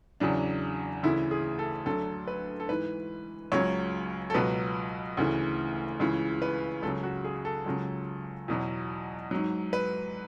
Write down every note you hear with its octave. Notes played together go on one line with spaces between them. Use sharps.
E2 C#3 F#3 D4
D2 C#3 E3 E4
G#4
A4
D2 D3 F#3 A4
B4
A4
G#2 E3 B4
C#2 C#3 F#3 C#5
A4
C#2 B2 F#3 B4
D2 C#3 E3
C#2 C#3 E3
B4
C#2 C#3 F#3 A4
F#4
G#4
A4
C#2 C#3 F#3
E2 B2 F#3
G#2 F#3
B4